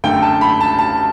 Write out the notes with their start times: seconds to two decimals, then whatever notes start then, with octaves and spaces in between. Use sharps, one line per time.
0.04 F#2 D3 A3 G5
0.22 A5
0.41 B5
0.61 A5
0.79 A5